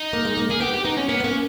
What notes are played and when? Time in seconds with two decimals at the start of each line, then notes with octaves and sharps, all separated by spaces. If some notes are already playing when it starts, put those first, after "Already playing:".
Already playing: D#4
0.13 A#3
0.25 G#3
0.37 A#3
0.50 A#3 G#4
0.60 B3 G4
0.73 G4
0.85 B3 D#4
0.97 C#4
1.08 A#3 B3
1.20 B3
1.24 A#3 C#4